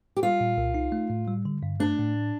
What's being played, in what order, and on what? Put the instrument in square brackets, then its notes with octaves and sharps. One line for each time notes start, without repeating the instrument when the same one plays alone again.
[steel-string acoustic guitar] G4
[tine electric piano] G3 [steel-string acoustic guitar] F4
[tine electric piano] A#2
C2
D#4
A3
A2
G3
D3
G2
[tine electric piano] A3 [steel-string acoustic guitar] D4
[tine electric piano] A2